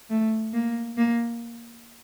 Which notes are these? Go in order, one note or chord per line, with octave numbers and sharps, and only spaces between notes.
A3
A#3
A#3